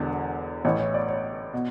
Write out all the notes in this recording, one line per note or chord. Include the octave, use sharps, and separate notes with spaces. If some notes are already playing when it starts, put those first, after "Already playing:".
Already playing: E1 E2 D3
A1 A2 E3 C#5
C#5
D5
C#5
B2